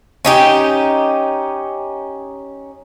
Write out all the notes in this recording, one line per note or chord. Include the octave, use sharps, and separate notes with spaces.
C#4 D#4 G4